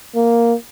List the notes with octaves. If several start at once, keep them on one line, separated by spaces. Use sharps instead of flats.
A#3